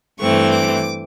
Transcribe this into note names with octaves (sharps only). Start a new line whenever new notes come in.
G2 E3 A3 C4 C#6
D6